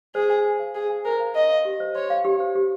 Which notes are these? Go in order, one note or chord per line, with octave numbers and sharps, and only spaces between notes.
G#4 C5
G#5
C5
F5
G#4 C5
G#5
A#4 C5
F5
D#5 C6
F5
G4
C5
C#5 C6
F5
G4
C5
G4